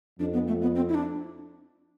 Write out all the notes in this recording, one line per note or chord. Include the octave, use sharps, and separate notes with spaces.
F2 D4
B3
A3
B3
C4
E4
D4